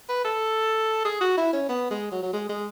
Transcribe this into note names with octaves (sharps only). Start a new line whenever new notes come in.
B4
A4
G#4
F#4
E4
C#4
B3
G#3
F#3
F#3
G#3
G#3